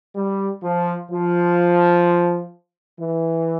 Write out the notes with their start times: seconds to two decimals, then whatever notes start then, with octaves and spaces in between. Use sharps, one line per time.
0.16 G3
0.63 F3
1.11 F3
3.00 E3